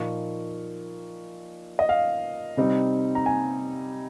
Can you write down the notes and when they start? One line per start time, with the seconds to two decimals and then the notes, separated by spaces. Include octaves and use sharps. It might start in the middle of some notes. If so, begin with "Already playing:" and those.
Already playing: A#2 F3 A#3 D#4 C#6
1.79 D#5
1.89 F5
2.57 C3 G3 C4 D#4
3.15 A#5
3.26 G#5